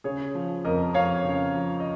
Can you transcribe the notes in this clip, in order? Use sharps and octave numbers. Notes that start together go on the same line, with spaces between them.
C#3 G#4 C#5
F3
F2 A#4 D#5
F2 C#5 F5
C#3
F3
D#5